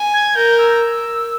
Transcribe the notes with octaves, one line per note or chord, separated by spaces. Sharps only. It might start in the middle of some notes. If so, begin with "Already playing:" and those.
Already playing: G#5
G#6
A#4 G6
E6